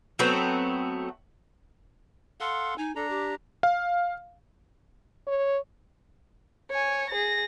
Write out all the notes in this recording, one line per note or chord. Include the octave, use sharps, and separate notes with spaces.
F#3 A3 B3 C4
A4 F5 F#5 C6
D#4 G#5
D4 A4 A#5
G4
F5
C#5
C#5 G#5
G#4 A#6